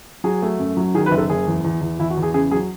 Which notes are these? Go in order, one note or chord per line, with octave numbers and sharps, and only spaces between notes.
F#3 G#4
A3
F#2
F#3
D#3 G#4
B4
F#1
A4
F#1 G#4
E2
E2
E2
E2 E4
F#4
E2
G#4
C#3 G#4
F#3 G#4